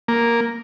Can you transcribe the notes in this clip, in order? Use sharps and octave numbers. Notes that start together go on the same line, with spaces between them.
A#3